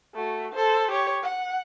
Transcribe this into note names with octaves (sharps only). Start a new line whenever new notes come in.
A3 F#4
A4 C5
G4 C#5
F#5